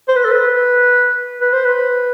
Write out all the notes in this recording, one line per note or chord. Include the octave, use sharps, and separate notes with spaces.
C5
B4
A4
B4
B4
C5
B4